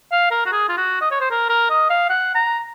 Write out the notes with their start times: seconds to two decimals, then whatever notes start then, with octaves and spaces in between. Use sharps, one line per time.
0.12 F5
0.31 A#4
0.46 F#4
0.52 G#4
0.69 F4
0.77 F#4
1.01 D#5
1.11 C#5
1.21 C5
1.31 A#4
1.49 A#4
1.70 D#5
1.90 F5
2.10 F#5
2.35 A#5